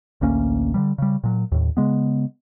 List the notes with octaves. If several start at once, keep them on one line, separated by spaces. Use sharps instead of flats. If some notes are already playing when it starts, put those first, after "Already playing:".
A1 D2 A#3 C#4
D3 F3 G3
C#3 G3
A#2 F#3
D#2 A2
C#3 G#3 B3